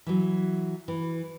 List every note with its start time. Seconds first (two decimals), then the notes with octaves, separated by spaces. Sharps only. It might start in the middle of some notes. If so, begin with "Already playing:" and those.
0.06 E3 F#3
0.88 E3